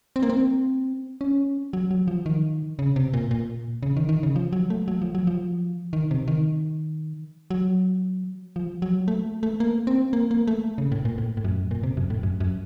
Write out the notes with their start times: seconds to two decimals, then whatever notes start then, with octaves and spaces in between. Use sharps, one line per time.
0.16 C4
0.23 A#3
0.30 C4
1.21 C#4
1.73 F#3
1.91 F#3
2.08 F3
2.26 D#3
2.79 C#3
2.96 C3
3.14 A#2
3.31 A#2
3.83 C#3
3.97 D#3
4.09 D#3
4.23 C#3
4.36 F3
4.53 F#3
4.70 A3
4.88 F#3
5.02 F3
5.15 F#3
5.27 F3
5.93 D#3
6.11 C3
6.28 D#3
7.51 F#3
8.56 F3
8.82 F#3
9.08 A3
9.43 A3
9.60 A#3
9.87 C4
10.13 A#3
10.31 A#3
10.47 A3
10.78 C#3
10.92 A2
11.05 A#2
11.18 A2
11.37 A2
11.44 F#2
11.71 A#2
11.83 C3
11.97 F#2
12.10 A2
12.23 F#2
12.40 F#2